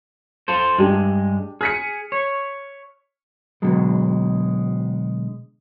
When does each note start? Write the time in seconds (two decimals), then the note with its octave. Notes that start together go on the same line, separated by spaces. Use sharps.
0.48 F4 A4 C5
0.78 G2 G#3 D4 G4
1.61 G#4 F6 B6 C#7
2.12 C#5
3.62 B2 D3 F#3 G#3